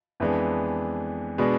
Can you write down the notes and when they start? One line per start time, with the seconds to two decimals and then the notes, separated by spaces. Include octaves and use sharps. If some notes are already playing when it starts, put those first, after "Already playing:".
0.20 F2 E3 G#3 B3 D4
1.38 B2 G#3 B3 D4